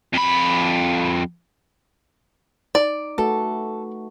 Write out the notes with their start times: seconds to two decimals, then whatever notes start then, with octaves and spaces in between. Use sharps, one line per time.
0.13 F2 B5
2.75 D#4 D5
3.18 A3 F#4 A4 B4